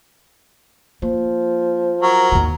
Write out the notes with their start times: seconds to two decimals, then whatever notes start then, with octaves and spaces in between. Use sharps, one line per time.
1.02 F3 A#3
2.02 F#3 A#4
2.32 D#2 D#3